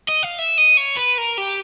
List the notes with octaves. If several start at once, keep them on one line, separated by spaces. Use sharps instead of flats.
D#5
F5
E5
D#5
C#5
B4
A#4
G4